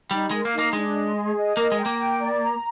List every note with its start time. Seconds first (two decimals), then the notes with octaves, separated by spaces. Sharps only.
0.11 G3 D#4
0.31 G#3 A#4
0.45 A#3
0.53 D#4
0.59 A#3
0.73 G#3 D4
0.94 D#5
1.15 G#4
1.36 D#5
1.56 A#3 A#4
1.72 G#3
1.78 G5
1.86 A#3
1.98 G5
2.20 D5
2.41 A#5